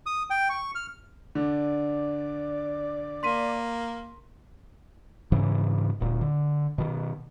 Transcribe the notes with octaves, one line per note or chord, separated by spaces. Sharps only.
D#6
G5
C#6
F6
D3 D5
A#3 C6 B6 D#7
G#2 C#3 E3
D1 A#2
D3
B2 D#3